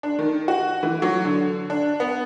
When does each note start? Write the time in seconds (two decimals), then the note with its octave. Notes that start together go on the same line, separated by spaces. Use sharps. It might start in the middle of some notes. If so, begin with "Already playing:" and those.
0.03 D4
0.19 D#3
0.48 F#4
0.83 E3
1.02 F#3
1.25 D3
1.70 D4
2.00 B3